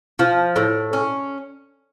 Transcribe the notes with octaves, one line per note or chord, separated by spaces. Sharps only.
F3
A2
C#4